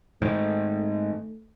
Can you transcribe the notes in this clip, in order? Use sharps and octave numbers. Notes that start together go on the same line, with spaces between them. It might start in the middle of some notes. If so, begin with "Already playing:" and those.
G#2 D#3 A3